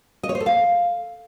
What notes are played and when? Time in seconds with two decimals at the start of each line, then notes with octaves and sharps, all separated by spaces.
0.23 D#5
0.29 C#5
0.35 C5
0.40 A4
0.46 F5